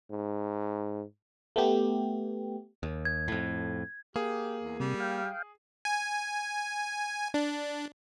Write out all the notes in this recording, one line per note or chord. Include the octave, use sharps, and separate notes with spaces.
G#2
A3 B3 G4
D#2
G#6
F2 A2
A#3 G4 G#4
E2
C3 G3
F5 G5
G#5
D4